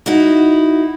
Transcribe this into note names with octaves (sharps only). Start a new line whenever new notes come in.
D#4 E4 F#4